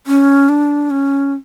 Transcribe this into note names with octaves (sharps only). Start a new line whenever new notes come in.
C#4
D4
C#4